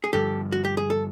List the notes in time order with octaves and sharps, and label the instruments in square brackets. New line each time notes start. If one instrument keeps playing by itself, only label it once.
[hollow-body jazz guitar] G#4
[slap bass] G2 D3 F3 [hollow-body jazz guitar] G4 A4
[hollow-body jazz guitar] F#4
G4
G#4
A4